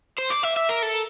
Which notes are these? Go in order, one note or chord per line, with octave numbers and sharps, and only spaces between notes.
C5
D5
E5
E5
A#4
A4